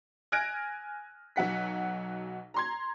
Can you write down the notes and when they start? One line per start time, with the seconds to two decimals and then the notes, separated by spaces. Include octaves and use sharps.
0.32 G#5 F6 F#6 G#6 A#6 D7
1.36 B1 F#3 F#5 B6
2.54 A#5 C6 G#6